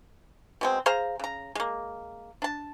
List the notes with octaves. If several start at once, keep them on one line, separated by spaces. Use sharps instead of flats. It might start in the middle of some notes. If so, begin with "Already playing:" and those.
B2 G#3 C4
G#4 C5 F5 A#5
C#3 A#5
G#3 A#3
D4 A5